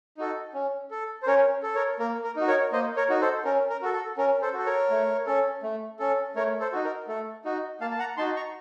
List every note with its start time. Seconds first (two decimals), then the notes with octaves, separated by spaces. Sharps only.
0.17 D#4 F#4 A4
0.54 C#4
0.91 A4
1.23 C5
1.27 C#4 A#4 C#5
1.63 A4
1.75 A#4 C#5
1.99 A#3 A#4
2.24 A#4
2.36 D#4 F#4
2.48 A#4 C#5
2.72 A#3 C5 D#5
2.96 A#4 C#5
3.09 D#4 F#4
3.21 A4 C5
3.44 C#4 A#4
3.70 A#4
3.82 F#4 A4
3.93 A4
4.17 C#4 A#4
4.42 A4 C5
4.54 F#4 A4
4.66 A#4 C#5
4.90 A3
5.26 C#4 A4
5.63 A3
5.99 C#4 A4
6.36 A3 A#4 C#5
6.60 A4 C5
6.72 D#4 F#4
6.84 A#4
7.08 A3 A4
7.45 D#4 F#4
7.81 A#3 F5 A5
7.91 A5
7.99 F#5 A#5
8.17 D#4 F#4 A5 C6
8.36 A#5 C#6